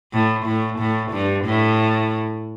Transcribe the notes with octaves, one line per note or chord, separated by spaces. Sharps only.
A2
A2
A2
G2
A2